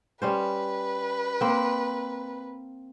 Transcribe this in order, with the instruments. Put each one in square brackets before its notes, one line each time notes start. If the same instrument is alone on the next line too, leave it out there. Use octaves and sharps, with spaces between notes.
[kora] G3 C#4 C5 [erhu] B4
[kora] A#3 C4